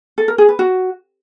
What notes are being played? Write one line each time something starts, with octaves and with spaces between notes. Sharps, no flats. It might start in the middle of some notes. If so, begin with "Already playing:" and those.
A4
A#4
G#4
B4
F#4